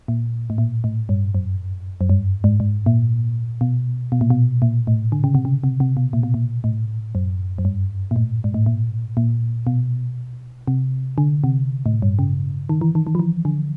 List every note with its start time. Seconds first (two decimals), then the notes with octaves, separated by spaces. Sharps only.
0.08 A#2
0.50 A2
0.58 A#2
0.84 A2
1.09 G2
1.35 F#2
2.01 F#2
2.10 G2
2.44 G#2
2.60 G#2
2.86 A#2
3.61 B2
4.12 B2
4.21 A#2
4.30 B2
4.62 A#2
4.87 A2
5.12 D3
5.24 C#3
5.35 C3
5.45 C#3
5.64 C3
5.80 C3
5.97 B2
6.13 A#2
6.23 B2
6.34 A#2
6.64 A2
7.15 F#2
7.58 F#2
7.65 G2
8.11 A#2
8.16 A2
8.44 G#2
8.54 A2
8.66 A#2
9.17 A#2
9.67 B2
10.68 C3
11.18 D3
11.44 C3
11.86 A2
12.02 G2
12.19 C#3
12.69 D#3
12.81 E3
12.95 D#3
13.07 D#3
13.15 F3
13.19 E3
13.45 D3